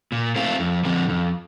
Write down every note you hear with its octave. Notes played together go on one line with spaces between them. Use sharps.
A#2
A3 C4 F4
F2
D3 F3 C4
F2